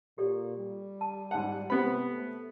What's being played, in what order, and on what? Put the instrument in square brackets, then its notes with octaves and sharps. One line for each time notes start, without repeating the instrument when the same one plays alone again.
[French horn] A#2 [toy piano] G4 A4 D5
[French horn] G3
[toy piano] A5
[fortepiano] G#2 F#5 [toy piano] D5 A5
[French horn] C3 [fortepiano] B3 B5 [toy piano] G4 C5
[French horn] A3